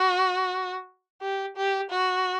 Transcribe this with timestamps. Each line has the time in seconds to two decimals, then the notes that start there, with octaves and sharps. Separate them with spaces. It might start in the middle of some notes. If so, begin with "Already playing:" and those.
Already playing: F#4
1.22 G4
1.57 G4
1.90 F#4